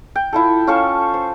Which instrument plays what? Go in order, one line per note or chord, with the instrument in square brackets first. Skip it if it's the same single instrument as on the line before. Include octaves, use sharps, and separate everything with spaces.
[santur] G5
E4 F4 A4
C#4 F4 A4 C#6
C5